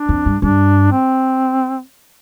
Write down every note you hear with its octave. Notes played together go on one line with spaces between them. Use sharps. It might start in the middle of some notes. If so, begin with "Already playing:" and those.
Already playing: D4
F2
G2
G2 D4
C4